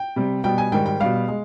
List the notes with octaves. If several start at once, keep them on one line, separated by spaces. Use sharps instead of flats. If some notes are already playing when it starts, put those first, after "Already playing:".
Already playing: G5
C3 G3
B2 G3 G5
G#5
G#2 D#3 G3 G5
G5
B2 G3 F5
G#3